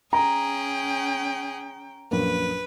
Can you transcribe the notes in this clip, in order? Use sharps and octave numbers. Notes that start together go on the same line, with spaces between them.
C#4 G#4 G5 A#5
A#1 F#2 A#3 B4